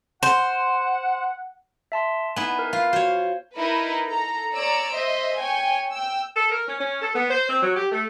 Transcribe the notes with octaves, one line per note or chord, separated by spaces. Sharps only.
C5 F#5
E5 A5 C6
B3 D#4 E4 G#5
A#4
F4 F5
F#4 C5 C#5
D#4 E4 A#4 B4 B5
A4 A#5
C#5 D5 A#5 E6 D7
C5 D#5 E5
C#5 G5 G#5
G5 E6
A4
A#4
C#4
C#4
A4
B3
C5
C4
F#3
G4
A3